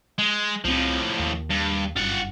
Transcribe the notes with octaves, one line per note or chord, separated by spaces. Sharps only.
G#3
C2 A2 F3 C4
D#2
G2
F#1 G2 F4 F#5